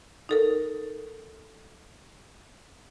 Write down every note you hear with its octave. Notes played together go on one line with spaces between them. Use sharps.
D#4 A4 A#4